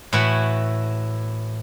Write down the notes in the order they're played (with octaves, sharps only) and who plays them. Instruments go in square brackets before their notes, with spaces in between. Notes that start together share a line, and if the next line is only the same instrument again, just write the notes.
[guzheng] A2 E3 E4 F#4 F#5